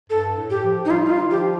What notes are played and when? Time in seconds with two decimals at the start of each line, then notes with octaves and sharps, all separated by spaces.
0.10 G2 A4
0.36 A2
0.50 G4
0.64 F3
0.85 D#4
0.90 G3 F4
1.06 D#4
1.11 F4
1.21 D#3
1.31 F3 G4